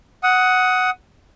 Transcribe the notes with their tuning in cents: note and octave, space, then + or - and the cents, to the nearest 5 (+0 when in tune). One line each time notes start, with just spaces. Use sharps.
F#5 +0 D#6 +15